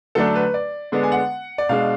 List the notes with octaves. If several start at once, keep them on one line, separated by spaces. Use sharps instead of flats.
D3 F#3 A3 D4 A4
B4
D5
D3 G#3 B3 D4
G#5
F#5
D5
B2 G#3 D4 F5